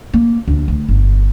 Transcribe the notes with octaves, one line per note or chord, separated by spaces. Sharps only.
A#3
D2
D2
G1